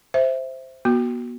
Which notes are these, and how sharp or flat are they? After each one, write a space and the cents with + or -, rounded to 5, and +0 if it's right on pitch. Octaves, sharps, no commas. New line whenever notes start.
C5 +0 E5 +0
B3 -40 F#4 +5